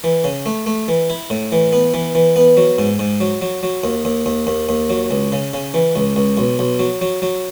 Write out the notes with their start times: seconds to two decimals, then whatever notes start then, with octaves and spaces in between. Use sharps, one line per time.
0.04 E3
0.24 C#3
0.46 A3
0.66 A3
0.88 E3
1.10 E4
1.30 A2
1.52 E3
1.73 B3
1.94 E3
2.15 E3
2.36 B3
2.57 F#3
2.78 G#2
2.99 G#2
3.21 F#3
3.42 F#3
3.63 F#3
3.84 D#2
4.05 D#2
4.26 D#2
4.47 D#2
4.69 D#2
4.90 F#3
5.11 C#2
5.32 C#3
5.54 C#3
5.74 E3
5.96 C#2
6.16 C#2
6.37 B1
6.59 B1
6.79 F#3
7.01 F#3
7.22 F#3